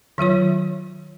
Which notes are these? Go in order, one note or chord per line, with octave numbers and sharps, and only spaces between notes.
D#3 F#3 F4 C#5